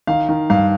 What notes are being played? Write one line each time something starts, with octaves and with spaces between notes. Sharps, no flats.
D#3 F5
D#3
G2 F5